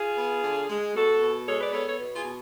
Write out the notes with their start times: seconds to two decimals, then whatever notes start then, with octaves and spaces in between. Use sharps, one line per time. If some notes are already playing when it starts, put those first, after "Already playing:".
Already playing: F4 G#4
0.18 B3
0.44 D3
0.69 G#3
0.95 B2 F#4 A4
1.21 B2
1.47 G#3 A4 C#5
1.60 B4 D5
1.73 B3 A4 C#5
1.86 A4 C#5
1.98 B2
2.15 F4 G#4
2.25 B2